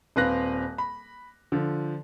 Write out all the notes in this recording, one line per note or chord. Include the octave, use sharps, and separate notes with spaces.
D#1 C4 B4 F5 F#6 A#6
B5
D3 F3